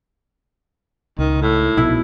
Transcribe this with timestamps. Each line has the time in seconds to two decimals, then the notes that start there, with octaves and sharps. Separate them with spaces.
1.19 C#2 D#3
1.41 A2
1.77 A#1 B2 E4